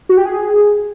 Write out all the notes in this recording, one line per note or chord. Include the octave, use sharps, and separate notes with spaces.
F#4
G4
G#4